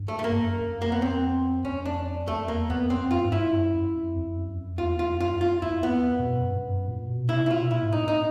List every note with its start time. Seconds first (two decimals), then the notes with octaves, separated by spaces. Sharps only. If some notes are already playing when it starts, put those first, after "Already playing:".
Already playing: G2
0.08 A3
0.19 A3
0.24 A#3
0.32 G2
0.40 F#2
0.61 F#2
0.72 F2
0.82 A#3
0.92 B3
1.02 C4
1.65 F2 C#4
1.85 D4
2.28 F2 A3
2.48 E2 A#3
2.70 F2 B3
2.90 F2 C4
3.11 F#2 F4
3.25 G#2
3.32 G2 E4
3.53 F#2
3.74 F#2
3.94 F2
4.16 F2
4.37 F#2
4.58 F2
4.78 E2 F4
4.99 F2 F4
5.20 F#2 F4
5.41 F4
5.62 F2 E4
5.83 F2 B3
5.99 E2
6.04 F2
6.19 B2
6.35 F#2
6.51 G2
6.66 F#2
6.87 A#2
7.08 B2
7.29 C3 E4
7.46 E4
7.50 B2 F4
7.71 A#2 E4
7.82 G#2
7.92 A2 D#4
8.07 A2 D#4